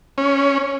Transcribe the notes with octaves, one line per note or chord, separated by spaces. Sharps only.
C#4